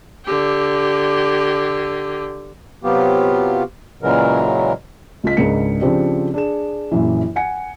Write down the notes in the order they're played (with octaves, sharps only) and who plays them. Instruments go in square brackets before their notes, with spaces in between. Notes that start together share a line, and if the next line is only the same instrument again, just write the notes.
[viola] D3 G4
[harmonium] C3 F#3 B3 F4 G4
A#2 C#3 E3 F#3 G#3 A#4
[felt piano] C#2 F4 D#5 B6
C#2 G#2 D4 A#4 C#7
C#3 F3 C4 D4 G4
D4 G#4 E7
A#1 F#2 E3
F#5 G#5 C#7